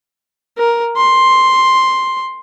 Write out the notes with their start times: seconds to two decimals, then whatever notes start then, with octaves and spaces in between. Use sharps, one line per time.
0.58 A#4
0.97 C6